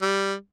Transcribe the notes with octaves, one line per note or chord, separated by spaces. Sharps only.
G3